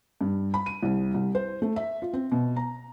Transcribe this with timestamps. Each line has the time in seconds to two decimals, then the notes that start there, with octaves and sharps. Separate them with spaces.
0.21 G2
0.54 B5
0.66 D#7
0.82 C2
1.14 C2
1.35 C5
1.62 A3
1.76 E5
2.02 F4
2.13 C4
2.32 B2
2.56 A#5